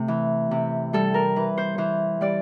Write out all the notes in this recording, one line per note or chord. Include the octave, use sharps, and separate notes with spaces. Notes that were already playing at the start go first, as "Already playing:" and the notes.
Already playing: C3 A3
E3
C3
G3 A4
A#4
E3 B4
C5
E3 C5
G3 D5